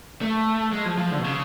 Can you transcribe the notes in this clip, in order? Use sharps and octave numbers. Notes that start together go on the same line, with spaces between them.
A3
G#3
F3
F3
D3
B2
C#3